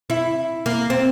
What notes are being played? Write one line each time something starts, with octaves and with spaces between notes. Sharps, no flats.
E4
A#3
C4